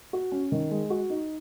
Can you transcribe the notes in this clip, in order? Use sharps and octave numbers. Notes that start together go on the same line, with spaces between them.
F#4
C#4
D#3
G#3
F#4
D#4